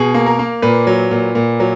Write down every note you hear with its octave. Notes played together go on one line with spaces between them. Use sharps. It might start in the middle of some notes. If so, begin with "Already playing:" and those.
Already playing: B2 G#4
A#3
A#4
A#3
A#2 B4
F#3
A#2
A#2
F#3